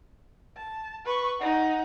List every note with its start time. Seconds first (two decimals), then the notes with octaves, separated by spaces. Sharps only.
0.57 A5
1.05 B4 C#6
1.40 D#4 F#5